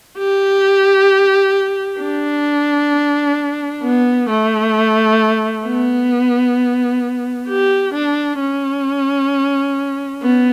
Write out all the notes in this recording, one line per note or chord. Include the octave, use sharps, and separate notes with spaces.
G4
D4
B3
A3
B3
G4
D4
C#4
B3